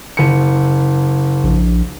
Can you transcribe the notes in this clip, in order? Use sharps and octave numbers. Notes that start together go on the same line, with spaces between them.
F#1 C#7
A#1